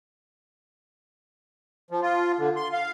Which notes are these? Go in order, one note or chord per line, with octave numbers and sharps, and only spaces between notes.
F3
F4
D3
C6
F5